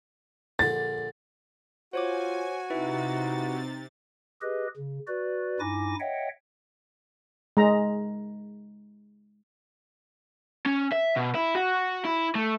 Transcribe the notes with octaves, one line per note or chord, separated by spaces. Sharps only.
A#1 D3 A6
F4 F#4 C5 C#5 G#5 D6
C3 D#4 E4 B4 E5 A6
G4 G#4 B4 D#5
C#3
F#4 B4 D5
G2 D#4 E4 G#5 D6 A#6
C#5 D#5 E5 F#5 G5
G#3 A#5
C#4
E5
B2
E4
F#4
E4
A3